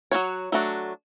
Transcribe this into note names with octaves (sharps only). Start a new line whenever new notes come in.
F#3 C#4 F#4 C#5
F#3 A3 D4 F#4